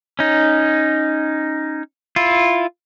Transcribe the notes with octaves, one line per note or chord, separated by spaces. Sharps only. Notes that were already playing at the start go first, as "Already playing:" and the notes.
C#4 D#4
E4 F4